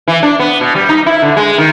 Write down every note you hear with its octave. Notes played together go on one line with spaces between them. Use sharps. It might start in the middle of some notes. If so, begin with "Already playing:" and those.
E3
D4
B3
B2
G3
D#4
E4
D3
G#3
D#3